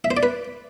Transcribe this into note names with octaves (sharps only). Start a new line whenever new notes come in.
E5
C5
D5
B4